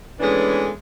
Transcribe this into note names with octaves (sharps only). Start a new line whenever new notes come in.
E3 G#3 A3 B3 C#4 D4